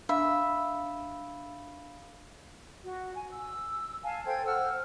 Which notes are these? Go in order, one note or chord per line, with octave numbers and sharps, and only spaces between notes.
D4 E5 F5 B5
F#4
G#5
E6
F5 G#5 A5
A4 C5 G5 G#6
C5 F#5 E6 F6